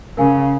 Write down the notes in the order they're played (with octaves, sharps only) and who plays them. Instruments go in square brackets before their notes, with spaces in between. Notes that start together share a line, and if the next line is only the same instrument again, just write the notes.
[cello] C#3 [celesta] A#4 F5 G#5